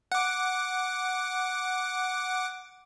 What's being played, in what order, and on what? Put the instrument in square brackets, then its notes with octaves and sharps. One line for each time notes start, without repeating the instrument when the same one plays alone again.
[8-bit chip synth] F#5 D6